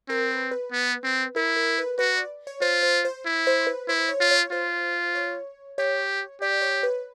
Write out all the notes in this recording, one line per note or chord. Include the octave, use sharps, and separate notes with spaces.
C4 A#4
B4
B4
B3
C4
E4 A#4
A#4
B4
F#4 B4
D5
C#5
F4 C5
C5
C5
E4
C5
B4
E4 C5
C#5
F4
C#5
F4 C5
C#5
G4 C#5
G4 D5
C#5
B4